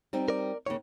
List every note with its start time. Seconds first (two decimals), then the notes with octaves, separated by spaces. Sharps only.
0.13 G3 C4 D#4
0.28 A#4 D5
0.66 D#2 C#3 A#3 C#5